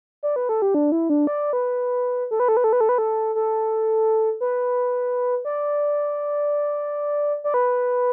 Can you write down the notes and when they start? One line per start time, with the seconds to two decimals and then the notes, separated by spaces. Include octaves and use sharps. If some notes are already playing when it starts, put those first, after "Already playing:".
0.23 D5
0.36 B4
0.49 A4
0.62 G4
0.74 D4
0.92 E4
1.10 D4
1.27 D5
1.53 B4
2.31 A4
2.40 B4
2.48 A4
2.57 B4
2.64 A4
2.73 B4
2.81 A4
2.89 B4
2.98 A4
3.35 A4
4.41 B4
5.45 D5
7.44 D5
7.54 B4